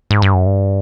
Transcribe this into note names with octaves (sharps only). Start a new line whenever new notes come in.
G#2
G2
F#2
G2